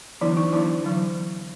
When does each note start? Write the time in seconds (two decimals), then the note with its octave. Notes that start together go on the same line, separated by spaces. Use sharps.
0.21 D3 E3 F#3 B3 D4 E4
0.37 D#4
0.52 D3 E3 F#3 B3 D4 E4
0.85 D3 F#3